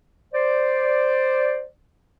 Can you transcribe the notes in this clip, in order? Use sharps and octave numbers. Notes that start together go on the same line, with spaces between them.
C5 D5